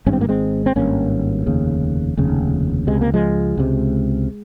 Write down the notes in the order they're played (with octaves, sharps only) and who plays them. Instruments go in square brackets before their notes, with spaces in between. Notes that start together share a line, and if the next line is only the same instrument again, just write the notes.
[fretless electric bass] G#1 G2 C#4
C4
A#3
G#3 C4
C4
G#1 G2 A#3 C#4
F1 D#2 C#3
F1 D#2 C#3
C#2 C3 G#3
A#3
F3 G#3
C#2 C3